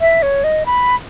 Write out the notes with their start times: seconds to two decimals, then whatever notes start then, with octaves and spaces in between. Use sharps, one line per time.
0.01 E5
0.22 C#5
0.44 D#5
0.66 B5